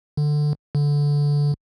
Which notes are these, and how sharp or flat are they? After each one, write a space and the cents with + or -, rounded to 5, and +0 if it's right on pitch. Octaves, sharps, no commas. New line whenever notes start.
D3 +15
D3 -15